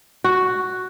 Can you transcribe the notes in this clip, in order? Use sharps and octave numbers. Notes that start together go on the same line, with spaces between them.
F#4